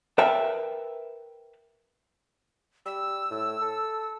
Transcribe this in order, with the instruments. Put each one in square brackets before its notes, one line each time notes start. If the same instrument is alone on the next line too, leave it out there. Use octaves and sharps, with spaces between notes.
[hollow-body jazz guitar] A#4 B4 E5 G5 A5
[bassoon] G3 [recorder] E6
[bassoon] A2
A4